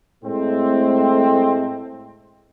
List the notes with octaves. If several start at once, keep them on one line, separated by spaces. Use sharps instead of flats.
A2 G#3 A3 C4